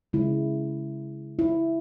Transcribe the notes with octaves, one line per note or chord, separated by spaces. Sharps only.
C#3 G#3 E4
E4